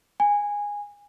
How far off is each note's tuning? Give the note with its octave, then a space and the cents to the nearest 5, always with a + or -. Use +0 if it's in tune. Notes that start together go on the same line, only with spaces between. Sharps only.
G#5 -15